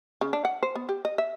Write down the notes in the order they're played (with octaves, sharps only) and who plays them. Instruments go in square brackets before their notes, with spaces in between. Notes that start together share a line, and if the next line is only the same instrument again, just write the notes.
[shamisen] C#3
D4
F#5
C5
B3
G4
D#5
E5